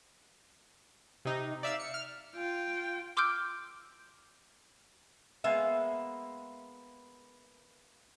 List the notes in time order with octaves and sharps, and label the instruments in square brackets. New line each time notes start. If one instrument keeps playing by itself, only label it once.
[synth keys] C3 D#4
D5 E5 F5 E6
C#7
F6
[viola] F4 G5
[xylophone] C6 D6 E6 F6 G6 D7
[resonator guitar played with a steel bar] G#3 A#3 B3 E5